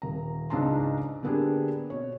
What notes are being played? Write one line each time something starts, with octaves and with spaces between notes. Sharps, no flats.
D#1 A#5
C#2 G#2 D4 A5 A#5 C6
D3 A#3 B3 D4 G4 G#4
B2 C#5